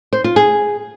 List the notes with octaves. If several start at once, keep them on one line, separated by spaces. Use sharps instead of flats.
C5
F4
G#4